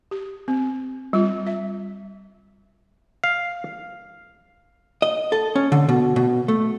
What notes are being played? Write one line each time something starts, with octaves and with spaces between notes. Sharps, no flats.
G4
C4
G3 F4
E5
F5
D#5
A4
C#4
D3
B2
B2
A3